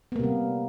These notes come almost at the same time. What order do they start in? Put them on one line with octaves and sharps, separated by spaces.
B3 A#3 C3 G3